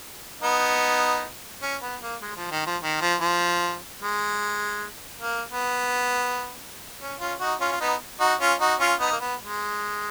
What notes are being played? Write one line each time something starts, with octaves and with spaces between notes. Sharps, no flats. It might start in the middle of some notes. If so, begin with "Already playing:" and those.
B3 D#4
C#4
B3
A#3
G#3
F3
D#3
F3
D#3
F3
F3
G#3
A#3
B3
C#4
C#4 F4
D#4 F#4
C#4 F4
F4
B3 D#4
D#4 F#4
C#4 F4
D#4 F#4
C#4 F4
B3 D#4
A#3
B3
G#3